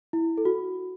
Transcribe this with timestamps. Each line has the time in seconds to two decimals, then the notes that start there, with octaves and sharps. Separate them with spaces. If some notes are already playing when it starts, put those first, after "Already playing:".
0.13 E4
0.38 A4
0.45 F#4